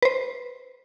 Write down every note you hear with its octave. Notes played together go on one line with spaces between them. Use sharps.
B4 C5